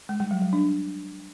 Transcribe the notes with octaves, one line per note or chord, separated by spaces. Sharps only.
G#3
G3
F#3
F#3
D4